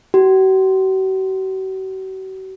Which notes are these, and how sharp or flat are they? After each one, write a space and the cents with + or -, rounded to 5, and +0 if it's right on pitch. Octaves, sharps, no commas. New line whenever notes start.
F#4 +45